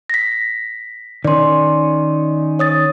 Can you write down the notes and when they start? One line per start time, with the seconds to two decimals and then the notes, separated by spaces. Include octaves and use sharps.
0.10 A#6 B6
1.25 D#3 C#4 D5 C6
2.59 C#5 D#6 A6